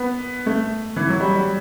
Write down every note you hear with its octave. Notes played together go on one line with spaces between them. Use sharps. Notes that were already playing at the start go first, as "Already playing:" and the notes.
Already playing: B3
A3
E3
F#3
G3
G3